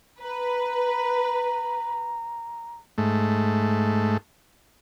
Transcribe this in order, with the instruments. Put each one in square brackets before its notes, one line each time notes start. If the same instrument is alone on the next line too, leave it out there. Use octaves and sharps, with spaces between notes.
[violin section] B4 [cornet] A#5
[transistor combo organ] G#2 A3